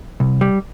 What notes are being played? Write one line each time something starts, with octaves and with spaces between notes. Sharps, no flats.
C2
G3